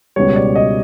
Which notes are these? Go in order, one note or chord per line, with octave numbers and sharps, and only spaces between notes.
C#2 B2 G3 C#5
D5
D#5